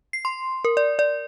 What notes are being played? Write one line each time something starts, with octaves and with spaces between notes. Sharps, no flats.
C7
C6
A#4
D5
D5